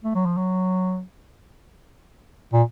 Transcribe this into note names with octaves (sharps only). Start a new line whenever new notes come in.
A3
F#3
F3
F#3
A#2